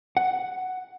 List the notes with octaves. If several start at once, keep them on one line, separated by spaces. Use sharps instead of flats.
F#5